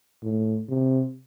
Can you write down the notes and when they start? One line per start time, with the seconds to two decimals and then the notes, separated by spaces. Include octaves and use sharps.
0.23 A2
0.69 C3